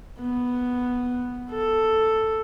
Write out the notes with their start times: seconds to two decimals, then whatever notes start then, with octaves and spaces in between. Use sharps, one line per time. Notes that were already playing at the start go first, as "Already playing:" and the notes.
0.19 B3
1.51 A4